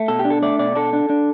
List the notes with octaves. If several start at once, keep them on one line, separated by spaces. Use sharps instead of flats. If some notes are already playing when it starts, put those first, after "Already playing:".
Already playing: A3
B2 A4
G4
D4
A4
A3 D5
B2 D5
D4 A4
D4
D4